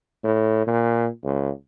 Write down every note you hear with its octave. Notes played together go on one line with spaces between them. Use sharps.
A2
A#2
C#2